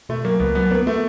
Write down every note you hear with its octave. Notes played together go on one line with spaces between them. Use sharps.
B2 A3
F#3 A#3
C#2 B3
F#3 B3
A#3 B3
A3 B3